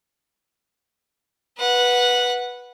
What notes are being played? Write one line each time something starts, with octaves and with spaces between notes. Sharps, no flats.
B4 F#5